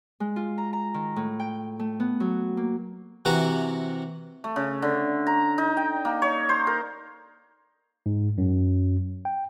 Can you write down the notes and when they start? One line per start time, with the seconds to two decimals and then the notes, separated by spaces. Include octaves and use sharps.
0.20 G#3
0.36 F4
0.58 A#5
0.73 A#5
0.94 D#3
1.16 A2
1.40 G5
1.79 A3
2.00 B3
2.20 F#3
2.57 A#3
3.25 C3 E3 F#4 F#5 A#5
4.44 A3
4.56 C#3
4.82 D3
5.27 A#5
5.58 D#4
5.77 G5
6.05 A#3
6.22 C#5
6.49 C5
6.67 A#4
8.06 G#2
8.38 F#2
9.25 G5